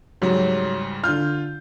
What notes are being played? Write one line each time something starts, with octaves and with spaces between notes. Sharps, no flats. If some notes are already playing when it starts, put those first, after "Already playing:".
G#2 C#3 F#3 G3
D3 F4 F6 G6